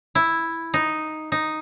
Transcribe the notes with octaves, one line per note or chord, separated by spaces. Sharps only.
E4
D#4
D#4